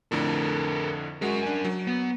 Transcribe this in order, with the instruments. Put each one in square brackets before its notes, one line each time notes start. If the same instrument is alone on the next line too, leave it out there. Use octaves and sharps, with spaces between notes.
[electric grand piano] F2 A2 D3 [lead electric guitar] A4 A#4
[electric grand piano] G#3 F#4 [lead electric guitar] C#4 A#4
[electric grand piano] D4 G#5
F#3
[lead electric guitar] B3